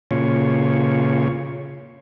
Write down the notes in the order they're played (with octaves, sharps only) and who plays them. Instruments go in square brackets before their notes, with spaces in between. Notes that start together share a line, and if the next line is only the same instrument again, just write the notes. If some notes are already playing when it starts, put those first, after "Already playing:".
[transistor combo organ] A#2 C#3 F4 C#5